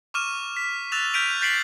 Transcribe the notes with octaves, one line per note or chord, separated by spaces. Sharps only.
C#6 D6 F6 D#7 E7
B6
E6 F#6 A6 B6 E7 F7
F6 G6 B6 D7 D#7 F7
G6 A6 B6 C7 D7 F#7